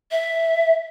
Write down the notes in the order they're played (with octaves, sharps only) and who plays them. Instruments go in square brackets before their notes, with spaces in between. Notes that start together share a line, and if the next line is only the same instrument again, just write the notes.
[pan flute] E5